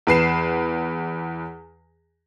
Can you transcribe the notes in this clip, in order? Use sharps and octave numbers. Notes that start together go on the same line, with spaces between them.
E2 B4 C7 E7